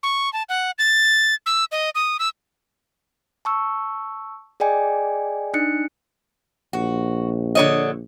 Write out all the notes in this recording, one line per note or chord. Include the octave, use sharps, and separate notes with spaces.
C#6
A5
F#5
A6
E6
D#5
D#6
E6
A5 C#6 E6
G#4 D5 D#5 G5 G#5
D4 D#4 F#6 C#7
A#1 F#4
D3 C#5 D#5